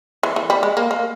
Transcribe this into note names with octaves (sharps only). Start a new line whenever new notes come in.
E3
E3
G3
G#3
A#3
A#3